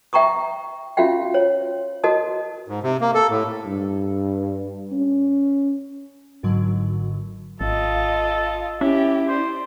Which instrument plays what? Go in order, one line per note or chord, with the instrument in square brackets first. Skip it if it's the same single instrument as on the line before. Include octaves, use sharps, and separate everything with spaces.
[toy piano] E5 G5 A#5 C#6 D#6
C#4 F4 F#4 E5 F5 G5
C#5
F#4 A#4 D#5 A5 D#6
[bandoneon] G#2
C3
A#3
A4
A2
[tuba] G2
C#4
[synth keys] G#1 G#2 D3 F#3
[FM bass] G#1 [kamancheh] F4 D#5 [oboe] A4
[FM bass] C#4 [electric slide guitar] E4 [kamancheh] G4
[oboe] C5 [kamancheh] D5